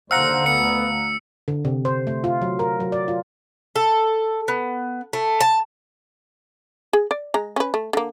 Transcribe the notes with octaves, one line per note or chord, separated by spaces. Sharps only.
D#2 D3 C5 F5 F#5 A#5 E6 C#7
D2 B3 C#7
D3
C3
C5
A3
F4
F#3
A#4
F#3
D5
F4
A4
B3
A3
A5
G#4
D5
G#3 A#5
C#4 B4
A3
D3 A#3